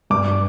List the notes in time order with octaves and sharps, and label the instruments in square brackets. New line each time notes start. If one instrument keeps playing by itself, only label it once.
[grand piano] G2 D6